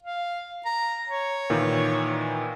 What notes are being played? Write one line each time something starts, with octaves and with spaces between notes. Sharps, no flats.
F5
A#5
C#5
A#2 D#3 E3